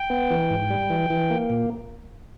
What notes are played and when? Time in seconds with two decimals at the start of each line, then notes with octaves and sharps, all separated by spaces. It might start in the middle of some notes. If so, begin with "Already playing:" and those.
Already playing: G5
0.10 B3
0.30 E3
0.50 G#2
0.70 G3
0.90 E3
1.10 E3
1.30 A#3
1.50 A#2